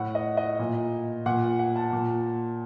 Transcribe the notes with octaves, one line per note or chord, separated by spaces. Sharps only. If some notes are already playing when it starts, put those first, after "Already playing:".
Already playing: A2 F#5
D#5
D#5
A#2
A#2 F#5
F#5
A5
A#2